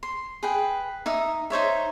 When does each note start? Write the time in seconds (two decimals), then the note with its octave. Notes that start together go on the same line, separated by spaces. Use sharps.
0.03 C6
0.43 G#4 B4 G5
1.06 D#4 E5 D#6
1.50 D#4 C5 C#5 E5